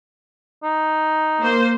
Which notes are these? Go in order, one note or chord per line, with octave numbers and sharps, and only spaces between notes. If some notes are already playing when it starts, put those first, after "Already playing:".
D#4
A#3 C5